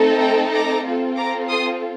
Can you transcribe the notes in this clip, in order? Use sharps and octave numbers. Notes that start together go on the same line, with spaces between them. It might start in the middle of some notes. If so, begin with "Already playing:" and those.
Already playing: A3 C4 D#4 A4
G5 A#5
A#5 D6
C4 F4 A4
A#5 D6
C6 D#6